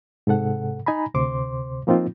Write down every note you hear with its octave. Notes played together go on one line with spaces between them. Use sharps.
G#2 C3 A4 F#5
D#4 G#5 A#5 B5
D2 C3 C5 C6 D6
F3 A#3 C4 D#4 F4